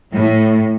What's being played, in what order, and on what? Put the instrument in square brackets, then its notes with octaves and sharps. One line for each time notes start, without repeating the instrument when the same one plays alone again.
[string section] A2